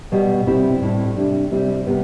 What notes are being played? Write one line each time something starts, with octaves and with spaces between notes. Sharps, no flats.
B2 G3 B3
C3 G3 C4 E4
A2 G3 C4 E4
C3 G3 D4
C3 G3 C4 E4
C3 G3 B3